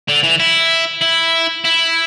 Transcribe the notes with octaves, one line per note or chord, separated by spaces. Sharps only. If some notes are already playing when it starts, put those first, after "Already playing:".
D3
E3
E4
E4
E4